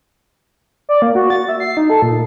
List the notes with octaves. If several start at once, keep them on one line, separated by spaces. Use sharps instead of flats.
D5
A#3
F#4
A6
E5
C7
D#4
A4
A#2